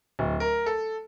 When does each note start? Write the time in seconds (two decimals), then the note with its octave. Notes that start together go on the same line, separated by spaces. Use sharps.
0.19 D1
0.40 A#4
0.66 A4